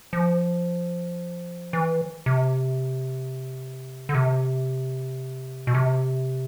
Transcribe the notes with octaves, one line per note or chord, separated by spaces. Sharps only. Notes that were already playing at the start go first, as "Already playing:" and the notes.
F3
E3
C3
D3
C3
B2
C3